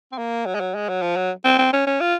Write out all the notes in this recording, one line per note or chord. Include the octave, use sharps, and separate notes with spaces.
C4
A#3
F#3
G#3
F#3
G#3
F#3
F3
F#3
C4
C4
C#4
C#4
F4